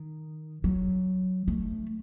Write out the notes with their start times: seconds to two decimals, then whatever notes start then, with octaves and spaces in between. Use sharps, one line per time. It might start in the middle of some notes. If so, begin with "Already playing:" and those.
Already playing: D#3
0.64 F#3
1.48 A3